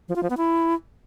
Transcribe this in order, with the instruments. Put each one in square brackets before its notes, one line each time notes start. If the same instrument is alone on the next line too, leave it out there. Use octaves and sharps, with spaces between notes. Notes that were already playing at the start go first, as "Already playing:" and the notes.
[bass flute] F3
F4
F3
B3
E4